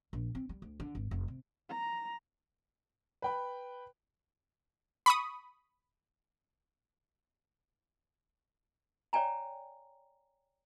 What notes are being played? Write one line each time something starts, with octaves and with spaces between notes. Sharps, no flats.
A#1
C4
G3
D2
D3
G#1
F1
C3
A#5
B4 G5 B5
B5 C#6 D#6
C#5 D5 G5 G#5 A#5